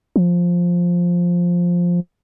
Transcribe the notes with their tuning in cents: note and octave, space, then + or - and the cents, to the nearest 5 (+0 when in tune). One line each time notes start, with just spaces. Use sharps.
F3 +5